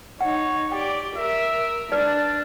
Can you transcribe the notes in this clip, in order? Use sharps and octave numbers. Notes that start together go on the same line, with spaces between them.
D#4 C#5 F#5
G4 D5 G5
A#4 E5
D4 B4 D5 A5